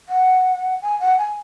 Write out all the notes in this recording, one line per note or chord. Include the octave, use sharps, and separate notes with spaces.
F#5
G#5
F#5
G#5